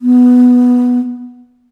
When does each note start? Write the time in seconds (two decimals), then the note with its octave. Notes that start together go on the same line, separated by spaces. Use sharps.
0.02 B3